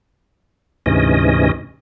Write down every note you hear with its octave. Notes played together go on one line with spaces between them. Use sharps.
D2 G#2 C3 E3 C#4 D#5